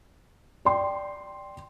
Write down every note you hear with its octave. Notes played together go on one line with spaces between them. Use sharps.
D5 G5 C6